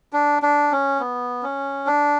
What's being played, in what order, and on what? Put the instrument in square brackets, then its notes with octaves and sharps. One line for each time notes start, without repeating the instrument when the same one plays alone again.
[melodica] D4
D4
C#4
B3
C#4
D4